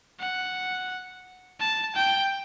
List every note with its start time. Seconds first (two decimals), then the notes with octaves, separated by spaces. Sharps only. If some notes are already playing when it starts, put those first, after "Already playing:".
0.20 F#5
1.60 A5
1.95 G5